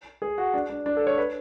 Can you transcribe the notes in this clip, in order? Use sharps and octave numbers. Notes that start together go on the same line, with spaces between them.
G#4
F#4
D4
D4
D4
A4
C#5
B4